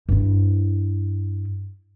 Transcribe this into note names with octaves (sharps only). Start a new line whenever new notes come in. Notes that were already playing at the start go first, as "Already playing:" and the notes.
G2 E4